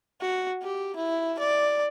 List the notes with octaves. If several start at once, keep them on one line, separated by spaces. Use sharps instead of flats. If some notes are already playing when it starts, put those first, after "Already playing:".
F#4
G4
E4
D5